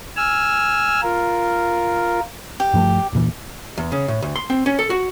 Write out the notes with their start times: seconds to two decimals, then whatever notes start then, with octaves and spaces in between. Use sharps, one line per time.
0.16 G#5 E6 F6
1.03 F4 A#4
2.60 G4
2.74 G2 F3 A3
3.13 E1 A#2 E3
3.78 E2
3.92 C#3
4.08 A2
4.22 D2
4.36 C6
4.50 C4
4.66 C#4
4.79 A4
4.90 F#4